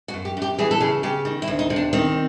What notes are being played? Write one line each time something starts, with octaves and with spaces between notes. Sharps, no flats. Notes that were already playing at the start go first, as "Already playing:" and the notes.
F#4
F#2
G4
F#2 G4
E3 G#4
A4
C#3 G#4
C#3 G4
D#3
E4
D2
D#4
C3
D4
D#3 C4